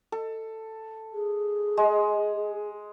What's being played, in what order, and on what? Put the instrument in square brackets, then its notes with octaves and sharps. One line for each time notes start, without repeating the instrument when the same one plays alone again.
[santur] A4
[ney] G#4
[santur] G#3